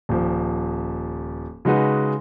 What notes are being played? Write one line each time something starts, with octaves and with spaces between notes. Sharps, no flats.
D#1 F3
C#3 G#3 D#4 F#4 B4